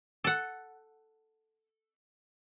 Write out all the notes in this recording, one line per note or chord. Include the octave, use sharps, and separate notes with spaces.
A4 F#5